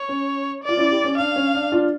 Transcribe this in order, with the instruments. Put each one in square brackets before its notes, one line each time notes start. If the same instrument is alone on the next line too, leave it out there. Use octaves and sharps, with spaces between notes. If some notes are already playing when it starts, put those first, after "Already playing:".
Already playing: [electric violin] C#5
[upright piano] C#4
[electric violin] D5
[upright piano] F4
C#4 E4
E4 G4
C#4
[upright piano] D4 [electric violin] F5
[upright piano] C#4
D4
D4 F4